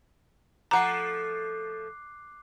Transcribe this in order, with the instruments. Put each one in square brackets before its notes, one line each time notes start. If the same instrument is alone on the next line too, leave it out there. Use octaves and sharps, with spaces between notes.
[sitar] F3 A3 [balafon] F#5 A#5 [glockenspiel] D6 F#6 C7